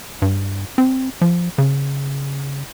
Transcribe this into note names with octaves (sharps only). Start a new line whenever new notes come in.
G2
C4
F3
C#3